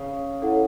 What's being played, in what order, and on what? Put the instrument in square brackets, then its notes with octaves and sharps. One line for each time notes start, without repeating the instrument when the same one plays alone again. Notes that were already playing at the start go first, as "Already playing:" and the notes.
Already playing: [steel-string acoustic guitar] C#3
[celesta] E4 A4 C#5 F#5